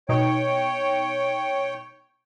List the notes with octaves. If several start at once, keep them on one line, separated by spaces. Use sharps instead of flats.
B2 D#4 C#5 G5